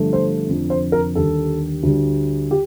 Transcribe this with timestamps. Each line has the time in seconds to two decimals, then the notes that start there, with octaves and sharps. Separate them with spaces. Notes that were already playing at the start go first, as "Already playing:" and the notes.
Already playing: G1 G2 F3 A3
0.13 C5
0.48 F1 F2 D3
0.70 C5
0.92 A#4
1.15 D#2 D3 G3 A4
1.83 D2 D3 G3
2.51 G4